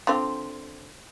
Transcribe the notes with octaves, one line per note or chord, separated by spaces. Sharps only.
D3 C4 F4